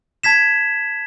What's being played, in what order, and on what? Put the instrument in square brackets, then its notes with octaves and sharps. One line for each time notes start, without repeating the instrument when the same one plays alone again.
[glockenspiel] A5 G#6 B6 E7